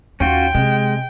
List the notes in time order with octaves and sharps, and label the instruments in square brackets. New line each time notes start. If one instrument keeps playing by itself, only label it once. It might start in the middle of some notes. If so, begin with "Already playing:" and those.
[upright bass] D#2 [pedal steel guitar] C#4 F4 F#4 [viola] G5
[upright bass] C3 [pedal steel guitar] G#3